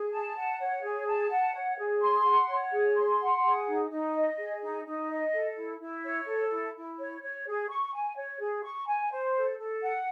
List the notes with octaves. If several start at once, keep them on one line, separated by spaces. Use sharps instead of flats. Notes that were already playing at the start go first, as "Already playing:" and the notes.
Already playing: G#4
A5
F#5
C#5
G#4
A5
F#5
C#5
G#4
C6
F#5
C#5
G#4
C6
F#5
G#4
D#4
D#4
D#5
G#4
D#4
D#4
D#5
A4
E4
E4
C#5
A4
E4
E4
C#5
C#5
G#4
C#6
G#5
C#5
G#4
C#6
G#5
C5
A4
A4
F#5